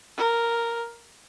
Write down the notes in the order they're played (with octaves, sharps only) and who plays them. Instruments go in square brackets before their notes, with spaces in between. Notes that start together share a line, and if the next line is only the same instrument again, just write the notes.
[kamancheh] A#4